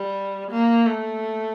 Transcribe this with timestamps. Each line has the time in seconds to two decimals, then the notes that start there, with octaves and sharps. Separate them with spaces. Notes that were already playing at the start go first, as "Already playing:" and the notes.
Already playing: G3
0.51 A#3
0.86 A3